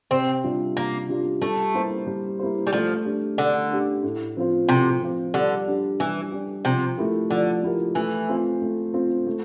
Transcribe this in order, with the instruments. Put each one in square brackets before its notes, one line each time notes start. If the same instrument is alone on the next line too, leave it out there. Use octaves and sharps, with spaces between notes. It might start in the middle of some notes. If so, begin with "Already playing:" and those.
[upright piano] C3 [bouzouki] C4
[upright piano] G3 D4 F4
[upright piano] C3 [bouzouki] A#3
[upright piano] G3 D4 F4
[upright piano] G3 [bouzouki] A3
[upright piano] A#3 E4 G4 C5
G3
A#3 E4 G4 C5
[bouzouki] G3
[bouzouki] F3 [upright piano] A3
[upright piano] D4 G4
[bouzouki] D3 [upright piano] A3
[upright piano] D4 G4
A2
F3 C4 F4 C5
[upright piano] A2 [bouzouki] C3
[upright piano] F3 C4 F4 C5
[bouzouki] D3 [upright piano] G3
[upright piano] D4 G4
[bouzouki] E3 [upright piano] G3
[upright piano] D4 G4
[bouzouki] C3 [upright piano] F3
[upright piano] A3 E4 G4 A#4
[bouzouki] D3 [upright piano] F3
[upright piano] A3 E4 G4 A#4
[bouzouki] E3 [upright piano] A3
[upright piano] C4 F4 C5
A3
C4 F4 C5
A3